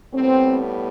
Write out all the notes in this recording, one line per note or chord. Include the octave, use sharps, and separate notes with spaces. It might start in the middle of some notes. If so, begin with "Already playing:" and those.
A2 G3 B3 C4